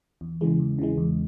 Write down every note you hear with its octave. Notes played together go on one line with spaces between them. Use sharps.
E2
C#3 E3 G#3
E2
C#3 E3 G#3
E2